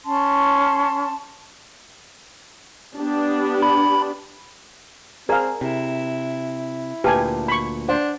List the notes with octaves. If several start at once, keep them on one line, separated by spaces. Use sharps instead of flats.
C#4 A5 C6
B3 D4 G4
B5
C4 G#4 A#4 D5 F5 A#5
C3 E4
D2 A#2 G4 B4 G#5 A5
B5 C#6
D4 C5 F#5